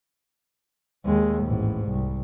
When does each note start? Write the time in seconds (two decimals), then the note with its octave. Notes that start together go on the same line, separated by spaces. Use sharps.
1.06 D#2 G#3
1.44 A1 G#2
1.87 C2